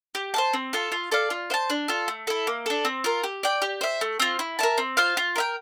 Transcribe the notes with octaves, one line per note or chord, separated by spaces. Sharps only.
G4
C5 F5 A5
C4
F4 A4
F4
A4 D5 F5
F4
C5 F5 A5
D4
F4 A4
A3
E4 A4
A#3
D4 A4
C4
F4 A#4
G4
D5 G5
G4
C5 E5
A3
C4 F4
E4
A#4 E5 A5
C4
F4 C5 F5
F4
A#4 E5 G5